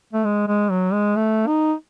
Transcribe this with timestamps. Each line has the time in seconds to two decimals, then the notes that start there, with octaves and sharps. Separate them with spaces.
0.13 A3
0.25 G#3
0.48 G#3
0.71 F#3
0.93 G#3
1.16 A3
1.47 D#4